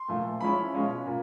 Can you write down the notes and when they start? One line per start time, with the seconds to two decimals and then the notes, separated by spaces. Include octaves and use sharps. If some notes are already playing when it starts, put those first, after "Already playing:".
Already playing: C6
0.08 A#2 F3 A3
0.41 F3 G#3 C#4 E4 B5
0.73 B2 G#3 C#4 F4
1.06 A#2